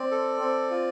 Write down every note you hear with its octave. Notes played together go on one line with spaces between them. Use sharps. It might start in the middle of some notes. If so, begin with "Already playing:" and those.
Already playing: C4 D5
A4
C4
F4